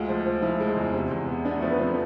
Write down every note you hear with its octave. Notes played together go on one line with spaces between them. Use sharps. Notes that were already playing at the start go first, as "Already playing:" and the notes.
Already playing: D2 G#3 F4
F3
F3
F3 E4
G#3
E2
C3
E2
B3
B3 D4
F3 A3
B3
F3 C4